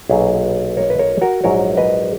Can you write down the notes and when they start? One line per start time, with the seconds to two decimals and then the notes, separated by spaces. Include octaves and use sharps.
0.09 B1 A#2 F#3 G#4 B4
0.77 A#4 C#5
0.90 B4
0.99 A#4 C#5
1.21 F#4 A#4
1.44 A#1 G#2 F#3 A#4 C#5
1.77 B4 D#5